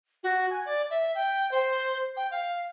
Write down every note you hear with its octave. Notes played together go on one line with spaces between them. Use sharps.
F#4
G#5
D5
E5
G5
C5
G5
F5